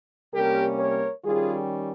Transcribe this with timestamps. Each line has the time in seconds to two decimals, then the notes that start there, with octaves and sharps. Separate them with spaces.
0.34 C3 G3 A#3 C#4 G4 A#4
0.79 A#4 C#5
1.24 D#3 G3 C#4 F4 G#4